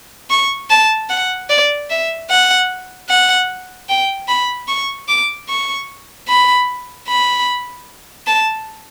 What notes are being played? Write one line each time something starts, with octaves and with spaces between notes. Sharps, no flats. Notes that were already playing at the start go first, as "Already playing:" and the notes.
C#6
A5
F#5
D5
E5
F#5
F#5
G5
B5
C#6
D6
C#6
B5
B5
A5